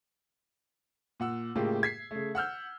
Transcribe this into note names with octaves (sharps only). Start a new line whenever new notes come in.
A#2 F#5 E6
A2 C#3 G#3 A#3 F4 G4
G#6 B6 C7
C#3 A3
F#5 E6 F6 G6